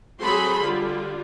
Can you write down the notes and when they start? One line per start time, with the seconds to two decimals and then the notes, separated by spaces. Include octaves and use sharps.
0.20 F#3 C4 G#4 A4 B5 C6
0.62 D3 G3 F4